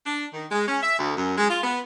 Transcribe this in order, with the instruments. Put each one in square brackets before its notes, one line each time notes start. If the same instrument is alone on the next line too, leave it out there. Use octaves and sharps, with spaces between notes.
[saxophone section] D4
D#3
G#3
C#4
E5
D2
F#2
G#3
F4
B3